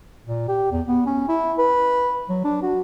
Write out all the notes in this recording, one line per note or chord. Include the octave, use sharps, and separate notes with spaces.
A#2
G4
E2
B3
C#4
E4
B4
F#3
D4
F#4